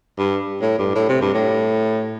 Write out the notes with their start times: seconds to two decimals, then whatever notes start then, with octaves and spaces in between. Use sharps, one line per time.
0.18 G2
0.62 A2
0.79 G2
0.96 A2
1.09 C3
1.22 G2
1.34 A2